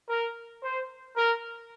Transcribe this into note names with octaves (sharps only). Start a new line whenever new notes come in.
A#4
C5
A#4